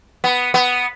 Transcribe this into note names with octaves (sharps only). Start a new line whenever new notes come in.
B3
B3